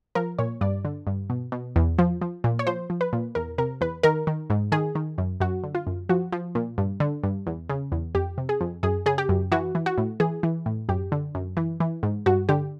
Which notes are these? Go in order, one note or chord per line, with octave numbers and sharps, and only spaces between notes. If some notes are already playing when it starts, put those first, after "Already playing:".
F3 A#4
A#2 C#5
G2 D5
D3
G2
B2
B2
E2
F3
F3
A#2
C#5
F3 C5
F3
B4
A#2
E2 A#4
C3 A#4
E2 B4
D#3 A#4
D#3
G#2
D#3 G#4
D#3
F#2
F#2 F#4
D3
F4
F#2
F3 F#4
F3
A#2
G2
D3
G2
E2
C#3
E2
F2 G4
C3
G#4
F2
F#2 G#4
C#3 G#4
G4
F#2
E3 F#4
E3
F#4
A2
E3 G#4
E3
A2
F#2 G4
D3
F#2
E3
E3
G#2
G2 F#4
D3 G4